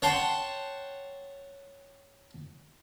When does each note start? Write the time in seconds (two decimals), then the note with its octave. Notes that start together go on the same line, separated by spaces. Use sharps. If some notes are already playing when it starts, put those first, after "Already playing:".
0.02 C#5 F#5 G5 A5 C6